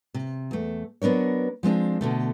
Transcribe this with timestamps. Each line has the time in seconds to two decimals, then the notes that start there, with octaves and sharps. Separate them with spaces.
0.14 C3
0.51 E2 A3
1.02 F#3 B3 D4 A#4 C#5
1.63 F3 G#3 C4 D4
2.01 B2 D3 A3